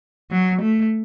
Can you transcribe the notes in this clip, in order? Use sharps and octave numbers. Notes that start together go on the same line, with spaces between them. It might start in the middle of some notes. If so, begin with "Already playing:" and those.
F#3
A3